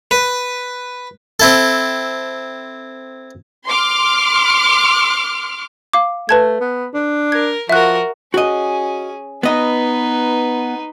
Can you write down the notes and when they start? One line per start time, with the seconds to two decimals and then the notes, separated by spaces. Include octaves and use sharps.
0.11 B4
1.40 C4 E4 A4
3.66 C6 D6 F6
5.93 F5 D6
6.29 A3 B4 A5 G#6
6.61 B3
6.94 D4
7.32 A#4 G#6
7.69 F3 F#4 A#4 E5 F#6
8.34 C#4 F#4 G#4 D#5
9.43 B3 D#4 B4 D#5